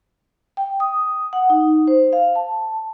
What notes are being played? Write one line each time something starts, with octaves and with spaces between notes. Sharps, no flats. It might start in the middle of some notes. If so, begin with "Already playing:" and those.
G5
D#6
F#5
D#4
C5
F5
A5